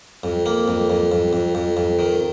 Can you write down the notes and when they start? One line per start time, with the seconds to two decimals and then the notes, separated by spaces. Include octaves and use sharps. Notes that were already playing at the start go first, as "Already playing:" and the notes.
0.24 F2
0.46 A#3
0.68 F2
0.90 F2
1.12 F2
1.33 F2
1.55 F2
1.77 F2
1.99 D#3